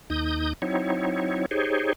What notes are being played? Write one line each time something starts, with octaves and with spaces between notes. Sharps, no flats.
D#2 D#4 D#6 G6
F#3 C4 D#4 E4 C#5
D#4 G4 G#4 C5 C#5